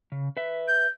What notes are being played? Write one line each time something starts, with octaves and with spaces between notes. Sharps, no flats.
C#3
B4 E5
G6